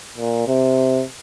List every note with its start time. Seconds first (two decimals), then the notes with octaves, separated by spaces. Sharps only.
0.17 A#2
0.48 C3